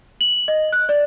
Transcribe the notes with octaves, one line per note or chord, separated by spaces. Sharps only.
F#7
D#5
F#6
D5